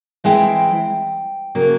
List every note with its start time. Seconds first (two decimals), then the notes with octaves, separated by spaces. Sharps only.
0.24 E3 G#3 C4 E4 G5
1.55 C#3 F#3 A#3